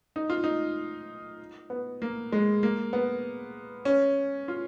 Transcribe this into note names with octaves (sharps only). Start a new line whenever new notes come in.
D#4
F4
D#4
B3
A#3
G#3
A#3
B3
C#4
F4